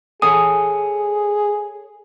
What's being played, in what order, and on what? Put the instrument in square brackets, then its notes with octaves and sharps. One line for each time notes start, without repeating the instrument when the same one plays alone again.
[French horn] G#4 [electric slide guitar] A4 C#5 G#5 [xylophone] D#6